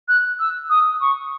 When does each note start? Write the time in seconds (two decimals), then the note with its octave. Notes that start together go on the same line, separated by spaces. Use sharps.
0.08 F#6
0.39 E6
0.70 D#6
1.01 C#6